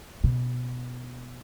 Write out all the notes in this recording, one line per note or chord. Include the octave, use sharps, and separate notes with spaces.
B2